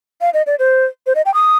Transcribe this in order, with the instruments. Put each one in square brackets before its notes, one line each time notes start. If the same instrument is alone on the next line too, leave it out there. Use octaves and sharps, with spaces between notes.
[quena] F5
D#5
D5
C5
C5
D#5
G5
D#6